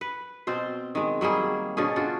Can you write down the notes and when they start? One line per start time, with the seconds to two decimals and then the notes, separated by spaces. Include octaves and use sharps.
0.01 B4
0.47 B2 C4 C5
0.95 D#3 G#3
1.21 F#3 G3 A#3 G#4
1.77 B2 D3 C#4 G#4
1.96 D4 F4 F#4